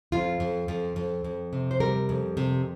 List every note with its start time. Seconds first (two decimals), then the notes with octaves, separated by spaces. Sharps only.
0.12 F2 F4
0.40 F2
0.68 F2
0.96 F2
1.24 F2
1.53 C3
1.71 C5
1.80 G3 A#4
2.09 F2
2.37 C3